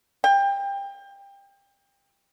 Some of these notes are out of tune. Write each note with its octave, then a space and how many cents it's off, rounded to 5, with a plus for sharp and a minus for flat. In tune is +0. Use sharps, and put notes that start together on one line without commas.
G5 +25